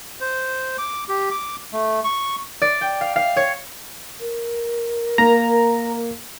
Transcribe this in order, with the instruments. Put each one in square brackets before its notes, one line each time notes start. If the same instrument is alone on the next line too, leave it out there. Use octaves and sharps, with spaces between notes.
[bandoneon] C5
D6
G4
D6
A3
C#6
[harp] D5
G5
F5
F5
C#5
[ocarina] A#4
[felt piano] A#3 [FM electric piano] A#5